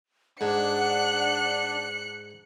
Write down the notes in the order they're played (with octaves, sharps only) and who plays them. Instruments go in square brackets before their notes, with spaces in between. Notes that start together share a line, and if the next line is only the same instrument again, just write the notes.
[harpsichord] G#2 [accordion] D4 [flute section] F#5 [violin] F#6 C#7